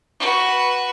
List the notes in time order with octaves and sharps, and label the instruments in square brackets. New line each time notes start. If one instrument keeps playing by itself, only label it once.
[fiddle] F#4 B4